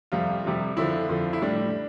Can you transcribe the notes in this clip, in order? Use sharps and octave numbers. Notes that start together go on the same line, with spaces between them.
F2 C3 G3 F4
F2 C3 G3
F2 D3 F3 E4
F2 D3 F3
E4
A2 G3 D4